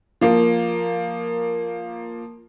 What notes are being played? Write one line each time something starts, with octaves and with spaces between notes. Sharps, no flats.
F3 A#3